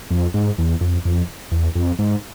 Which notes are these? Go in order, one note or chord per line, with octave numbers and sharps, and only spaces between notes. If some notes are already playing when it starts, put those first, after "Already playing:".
F2
G#2
E2
F2
F2
E2
F2
G#2